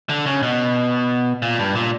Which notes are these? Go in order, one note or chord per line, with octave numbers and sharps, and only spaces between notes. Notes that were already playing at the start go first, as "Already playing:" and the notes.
D3
C#3
B2
A#2
G2
A#2